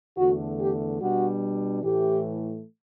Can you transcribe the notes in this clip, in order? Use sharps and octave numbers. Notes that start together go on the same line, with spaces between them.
E2 D3 A3 F#4
G4
B2 G3 D4 F#4
A2 E3 A3 G4